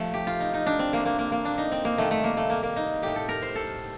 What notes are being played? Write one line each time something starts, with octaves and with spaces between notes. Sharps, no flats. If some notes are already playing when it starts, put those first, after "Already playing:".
Already playing: C3 F3 A3
G4
F4
D#4
D#4
D4
C4
D3 A3 A#3
A#3
A#3
A#3
D4
D#4
C4
A#3
C3 D#3 G3 A3
A3
A#3
A3
A#3
A#3
D#4
A2 A3 G4
A4
A#4
C5
A4